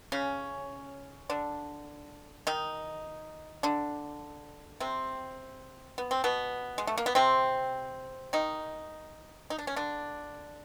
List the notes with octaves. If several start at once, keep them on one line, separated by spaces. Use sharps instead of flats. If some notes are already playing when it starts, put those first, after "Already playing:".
C#3 C#4
D3 D4
D#3 D#4
D3 D4
C3 C4
B3
C4
B2 B3
G#3
A3
A#3
B3
C3 C4
D#3 D#4
D#4
D4
C#4
D3 D4